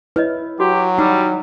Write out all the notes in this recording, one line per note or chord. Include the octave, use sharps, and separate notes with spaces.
E4 B4 C#5 D#5
F#3 F#4 G4
G3 D#4 F#5 E6